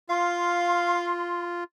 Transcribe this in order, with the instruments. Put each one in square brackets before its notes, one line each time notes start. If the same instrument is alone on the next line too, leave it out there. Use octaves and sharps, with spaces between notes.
[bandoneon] F4 [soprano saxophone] F5 [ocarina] C6